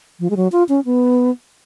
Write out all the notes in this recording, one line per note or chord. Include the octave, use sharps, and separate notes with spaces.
F3
G#3
F#3
F4
C#4
B3